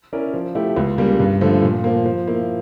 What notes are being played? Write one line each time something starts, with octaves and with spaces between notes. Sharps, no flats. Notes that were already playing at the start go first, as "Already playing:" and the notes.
C#4 E4 A#4 D5
F3
A3 E4 G4
C#2
C#3 G3 A#3
G2
D3 F3 A3
A#2
F3 A#3
F3
A#3 E4